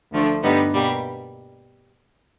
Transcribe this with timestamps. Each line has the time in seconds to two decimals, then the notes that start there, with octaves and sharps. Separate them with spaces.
0.12 D2 D3 F3 A3 D4
0.43 G2 D3 G3 B3 D#4
0.73 B2 G3 A#3